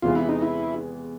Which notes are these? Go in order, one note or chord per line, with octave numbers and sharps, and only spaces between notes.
E2 C3 E3 G#3 B3 F4
E4
D#4
E4